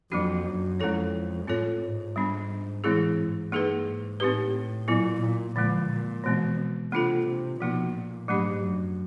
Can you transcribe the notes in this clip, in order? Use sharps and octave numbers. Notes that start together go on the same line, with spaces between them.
F2 F#3 A#3 D4 F#4
F#2
F2 G#3 C#4 E4 A4 C#5
A2 C4 F4 A4 C#5
G#2
G3 B3 D4
A2 E3 G#3 C4 E4 G#4
G#2
G2 A#3 D#4 G#4 B4
G#2
A2 C4 D#4 G4 B4
A#2 F#3 B3 E4
A#2
A#2 D3 F3 G#3
A#2
B2 E3 G#3 C4
C3 A#3 D4 F4 A4
C3
B2 F3 A#3 D#4
A#2
G#2 F#3 A3 D4 G4
F#2